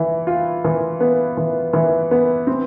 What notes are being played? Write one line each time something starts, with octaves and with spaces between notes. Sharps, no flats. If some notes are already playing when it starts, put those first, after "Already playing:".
Already playing: E3
F4
E3
B3
E3
E3
B3
C4